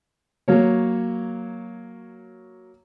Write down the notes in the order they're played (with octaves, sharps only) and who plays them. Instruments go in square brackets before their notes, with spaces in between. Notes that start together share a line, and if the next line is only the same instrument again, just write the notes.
[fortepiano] F#3 A#3 C#5